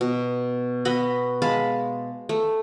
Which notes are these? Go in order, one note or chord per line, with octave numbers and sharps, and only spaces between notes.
B2
B3 F#4 D#5 B5
G#3 F5 A5 B5
A3